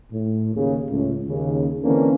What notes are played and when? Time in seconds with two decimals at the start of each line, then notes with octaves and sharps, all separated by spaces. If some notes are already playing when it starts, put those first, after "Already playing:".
0.12 A2
0.55 D#2 C#3
0.90 C#2 A2
1.27 D#2 C#3
1.83 D3 E3 A#3 C4 C#4